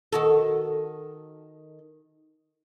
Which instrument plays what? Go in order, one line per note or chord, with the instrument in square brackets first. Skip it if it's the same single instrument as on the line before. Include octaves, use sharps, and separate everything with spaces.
[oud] D#3 F#4 A4